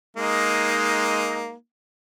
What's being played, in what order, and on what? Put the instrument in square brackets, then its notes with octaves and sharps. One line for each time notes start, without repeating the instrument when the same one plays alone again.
[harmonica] G#3 A#3 D#4